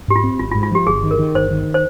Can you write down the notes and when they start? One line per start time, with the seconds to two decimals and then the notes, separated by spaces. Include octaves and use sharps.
0.08 G#2 G4
0.16 F4
0.24 C4
0.39 G#1 F4
0.51 F4
0.55 G#2
0.63 F4
0.71 F3 G4
0.87 G1 G#4
1.03 D#3
1.11 A#4
1.19 D#3
1.34 G1 C5
1.50 D#3
1.74 C5